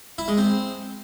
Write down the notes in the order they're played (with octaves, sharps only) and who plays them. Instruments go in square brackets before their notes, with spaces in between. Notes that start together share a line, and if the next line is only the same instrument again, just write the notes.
[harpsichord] E4
G#3
C4